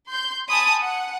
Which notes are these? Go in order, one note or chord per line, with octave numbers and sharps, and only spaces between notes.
C6 G6
G#5 A5 B5 D#6
F#5